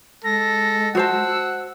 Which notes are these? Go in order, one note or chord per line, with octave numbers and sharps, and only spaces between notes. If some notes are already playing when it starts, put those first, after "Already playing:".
G#3 A4 A#6
F#4 C5 F#5 A5 E6